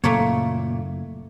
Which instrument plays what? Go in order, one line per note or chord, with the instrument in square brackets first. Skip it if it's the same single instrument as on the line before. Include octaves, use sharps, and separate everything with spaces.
[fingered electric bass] F#1 [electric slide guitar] A#2 [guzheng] A3 A#3 C#5